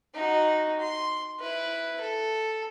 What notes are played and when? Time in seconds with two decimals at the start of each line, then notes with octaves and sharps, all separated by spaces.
0.15 D#4 F#4
0.80 C6
1.40 E4 B4
2.01 A4